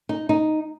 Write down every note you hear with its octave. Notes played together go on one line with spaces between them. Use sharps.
D#4
D#4